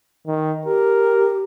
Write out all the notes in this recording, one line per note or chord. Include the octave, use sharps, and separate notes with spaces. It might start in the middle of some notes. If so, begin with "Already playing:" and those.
D#3
G4 A#4